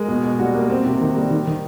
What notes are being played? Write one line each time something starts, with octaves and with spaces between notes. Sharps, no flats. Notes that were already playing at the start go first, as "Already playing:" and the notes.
Already playing: G#3 A#4
B2
B2
G3 F#4
A#3
C4
C3
D#3
G3
D#3
D#3